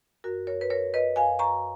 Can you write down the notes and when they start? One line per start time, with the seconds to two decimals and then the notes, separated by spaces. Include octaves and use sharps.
0.24 F#2 F#4 A#4
0.47 F#2 A#4 C#5
0.61 B4
0.70 F#2 A#4 C#5
0.93 F#2 B4 D#5
1.16 F#2 F5 G#5
1.39 F#2 A#5 C#6